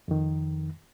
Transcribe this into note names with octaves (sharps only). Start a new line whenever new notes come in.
F2 D#3